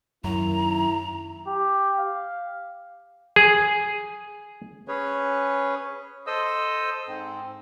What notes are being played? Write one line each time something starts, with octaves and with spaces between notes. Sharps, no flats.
F#2 D#3 A#3 E4 A#5
G4
F5
G#4
C#4 G#4 B4 C#5
A4 C5 D#5 D#6 E6
G#2 C4